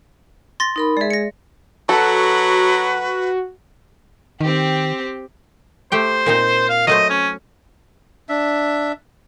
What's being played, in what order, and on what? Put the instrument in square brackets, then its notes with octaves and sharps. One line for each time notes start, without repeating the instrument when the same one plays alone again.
[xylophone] C6 A6 A#6
[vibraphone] D#4 A#4 B5
[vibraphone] G#3 G#4 [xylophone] D5 E5
[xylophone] A#6 C#7
[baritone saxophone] F#3 [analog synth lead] F#4 [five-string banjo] A4 [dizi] B4
[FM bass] D#3 [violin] C4 G4
[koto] A3 G4 G5 [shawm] C5
[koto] A#2 C4 D#4
[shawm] F5
[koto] F#3 A3 C5 [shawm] D#5
[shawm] C#4
[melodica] D4 E5